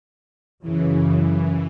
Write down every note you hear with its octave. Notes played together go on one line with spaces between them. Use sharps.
F#2 C#3 E3